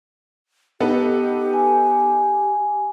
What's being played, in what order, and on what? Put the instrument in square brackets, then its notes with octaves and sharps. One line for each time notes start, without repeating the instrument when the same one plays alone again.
[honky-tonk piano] B3 D#4 A4 [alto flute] G4
[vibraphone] G#5